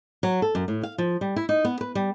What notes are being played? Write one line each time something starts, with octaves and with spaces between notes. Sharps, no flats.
F#3
A4
F#2
A2
F5
F3
G3
E4
D#4
B3
B4
G3